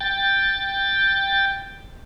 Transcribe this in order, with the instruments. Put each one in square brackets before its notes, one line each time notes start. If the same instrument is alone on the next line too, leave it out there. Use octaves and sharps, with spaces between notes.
[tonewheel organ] G5 A6